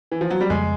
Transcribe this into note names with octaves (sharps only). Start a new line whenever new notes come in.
E3
F3
F#3
G3
F2 C#3 F3 G#3